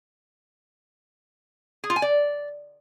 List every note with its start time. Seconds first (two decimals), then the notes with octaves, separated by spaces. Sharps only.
1.84 G#4
1.90 F4
1.96 G#5
2.02 D5